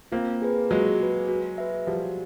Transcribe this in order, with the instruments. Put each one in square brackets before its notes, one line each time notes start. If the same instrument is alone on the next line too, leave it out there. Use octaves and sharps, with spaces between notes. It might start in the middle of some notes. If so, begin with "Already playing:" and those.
[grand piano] A#3 C4 [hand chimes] F4
[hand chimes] G#4 B4
[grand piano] F#3 G#3 [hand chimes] F4
[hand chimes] G#4 B4
F#4
B4 E5
[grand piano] F3 G3 [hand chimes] F#4